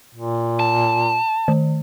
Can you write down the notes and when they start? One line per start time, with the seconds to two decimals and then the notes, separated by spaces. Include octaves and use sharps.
0.15 A#2
0.60 A5
1.48 D#3